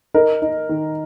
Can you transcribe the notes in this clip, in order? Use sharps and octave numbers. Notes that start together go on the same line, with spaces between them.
D#4 A#4
D#4
D#3